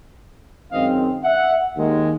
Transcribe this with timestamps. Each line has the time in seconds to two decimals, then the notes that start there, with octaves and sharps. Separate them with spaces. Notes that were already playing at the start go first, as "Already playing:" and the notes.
0.72 F#2 D#3 G#3 C4 D#5 F5
1.24 E5 F#5
1.76 D#2 D#3 G#3